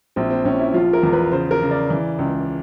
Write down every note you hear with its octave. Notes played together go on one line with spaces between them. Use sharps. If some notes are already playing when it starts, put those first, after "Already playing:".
A#1 C4
C4
A#1 C#4
E4
F3 F4
A#4
E2
B4
C#3 C5
A#4
C#3
D5
E3
C#2